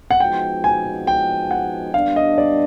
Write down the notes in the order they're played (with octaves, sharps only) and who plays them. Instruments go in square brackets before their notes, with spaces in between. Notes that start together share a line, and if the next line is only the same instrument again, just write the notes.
[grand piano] F#5
[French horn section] F3 G#3 B3 D#4 F#4 [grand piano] G5
[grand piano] G#5
G5
F#5
[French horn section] G3 B3 D4 [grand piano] F5
[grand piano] D#5
D5